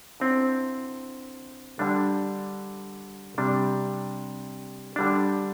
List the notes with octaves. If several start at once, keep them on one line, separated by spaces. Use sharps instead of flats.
D3 C4 E4
D3 G3 D4
C3 G3 D4
D3 G3 D4